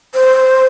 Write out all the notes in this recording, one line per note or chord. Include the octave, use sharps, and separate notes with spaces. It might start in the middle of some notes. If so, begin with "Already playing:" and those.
C5